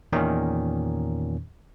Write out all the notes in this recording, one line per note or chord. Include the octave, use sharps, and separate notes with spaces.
E2 A#2 D#3 C#4